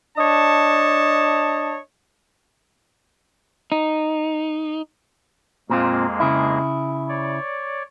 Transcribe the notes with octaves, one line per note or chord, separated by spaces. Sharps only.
D4 C#5 D#5 A5
D#4
F2 A#2 G#3 A#3 C4 F4
C#3 E4
C#5 D5